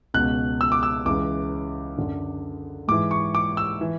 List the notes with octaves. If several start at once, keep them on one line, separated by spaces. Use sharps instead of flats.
C#2 B2 F#6
E6
D6
E6
C#2 C#3 E3 D6
F#2 D3
G#2 E3 D6
C#6
D6
E6
E3